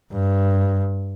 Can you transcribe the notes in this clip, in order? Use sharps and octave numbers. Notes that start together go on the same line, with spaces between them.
G2